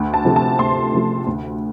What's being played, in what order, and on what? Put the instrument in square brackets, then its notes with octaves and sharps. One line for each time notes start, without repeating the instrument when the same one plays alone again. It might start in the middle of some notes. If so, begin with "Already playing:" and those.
Already playing: [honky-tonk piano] D2
A5
C3 F3 A3
A5
D2 C6
C3 F3 A3
D2